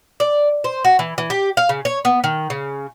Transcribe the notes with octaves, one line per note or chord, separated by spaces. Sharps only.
D5
C5
F#4
E3
E3
G4
F5
C#3
C#5
B3
D#3
C#3